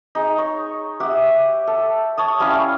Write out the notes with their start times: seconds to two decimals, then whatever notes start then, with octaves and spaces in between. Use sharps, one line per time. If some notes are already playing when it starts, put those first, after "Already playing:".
0.15 D#4 G#4
0.38 C#5
1.00 G4 E5 F#5
1.67 A4
2.17 C#5 A5 D#6
2.40 G3 C#4 E4 F5